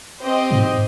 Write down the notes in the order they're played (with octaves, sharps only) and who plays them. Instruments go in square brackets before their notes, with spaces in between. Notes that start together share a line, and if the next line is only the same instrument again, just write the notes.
[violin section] C4 G4 C5 D#5
[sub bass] G#2